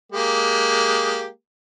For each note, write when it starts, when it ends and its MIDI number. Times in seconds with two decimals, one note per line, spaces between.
0.12 1.27 56
0.12 1.27 58
0.12 1.27 67